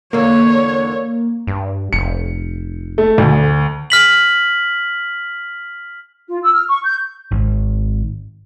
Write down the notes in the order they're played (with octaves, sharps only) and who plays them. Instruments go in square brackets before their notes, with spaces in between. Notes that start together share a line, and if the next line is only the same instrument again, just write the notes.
[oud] E2 D3 [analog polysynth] A#3 [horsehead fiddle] C#5
[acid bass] G2
[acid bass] F1 [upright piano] C#7
[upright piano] A3
[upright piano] D2 [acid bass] D3
[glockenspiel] F6 B6 F#7
[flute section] F4
E6
F6
C#6
G6
[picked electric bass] G#1